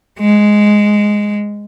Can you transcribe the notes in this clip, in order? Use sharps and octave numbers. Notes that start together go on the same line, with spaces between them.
G#3